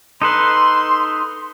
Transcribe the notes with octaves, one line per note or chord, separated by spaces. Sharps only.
D#4 A4 B4 C6